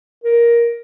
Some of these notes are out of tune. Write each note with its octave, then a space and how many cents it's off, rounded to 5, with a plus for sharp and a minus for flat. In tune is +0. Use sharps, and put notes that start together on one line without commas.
A#4 +10